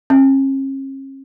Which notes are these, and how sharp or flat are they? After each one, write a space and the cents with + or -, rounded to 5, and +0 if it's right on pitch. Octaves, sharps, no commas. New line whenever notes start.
C#4 -45